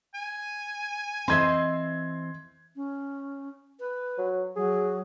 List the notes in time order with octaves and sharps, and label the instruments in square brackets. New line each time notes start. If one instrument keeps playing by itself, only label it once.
[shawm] G#5
[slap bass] E3 C4 [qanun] C5 D#5 E5 [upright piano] C6 G#6
[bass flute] C#4
B4
[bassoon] F#3
[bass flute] F#3 [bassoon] G#4